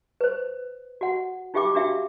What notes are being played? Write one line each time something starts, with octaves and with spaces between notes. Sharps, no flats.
B4 C5
F#4 F#5
D#4 F4 G4 E5 G5 D6
D4 F#4 E5 F5 G5